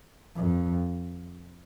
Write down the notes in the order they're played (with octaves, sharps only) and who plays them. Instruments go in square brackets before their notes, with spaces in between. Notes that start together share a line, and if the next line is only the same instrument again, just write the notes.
[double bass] F2